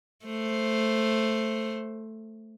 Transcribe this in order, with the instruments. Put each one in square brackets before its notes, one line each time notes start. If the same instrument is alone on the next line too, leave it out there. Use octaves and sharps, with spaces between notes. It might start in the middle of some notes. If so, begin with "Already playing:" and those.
[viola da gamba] A3 C5